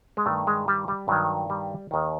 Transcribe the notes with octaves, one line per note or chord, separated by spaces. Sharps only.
G#3
G2 D#3 A3
G#3
G3
G3
G2 D#3 F#3
G3
D#2 D#3